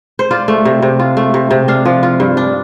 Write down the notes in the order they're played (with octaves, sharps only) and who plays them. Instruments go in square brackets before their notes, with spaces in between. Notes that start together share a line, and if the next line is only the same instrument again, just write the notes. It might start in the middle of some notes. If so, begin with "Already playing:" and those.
[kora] C5
F4 D5
A3
C3
C3
F4
A3
C3
C3
D4 F5
F3
F4
G2
D4